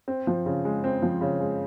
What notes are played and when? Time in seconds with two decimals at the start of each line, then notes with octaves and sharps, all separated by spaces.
0.08 C4
0.27 F3
0.46 C#3
0.65 G#3
0.84 C4
1.02 F3
1.21 C#3
1.40 G#3